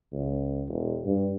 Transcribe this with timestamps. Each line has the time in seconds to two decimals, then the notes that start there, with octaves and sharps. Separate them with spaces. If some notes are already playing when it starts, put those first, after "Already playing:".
0.13 C#2
0.68 E1
1.06 G2